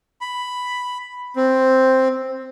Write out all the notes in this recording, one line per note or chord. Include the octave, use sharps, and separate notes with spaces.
B5
C4